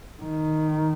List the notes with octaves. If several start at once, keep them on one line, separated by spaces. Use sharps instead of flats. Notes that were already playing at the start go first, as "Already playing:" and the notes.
D#3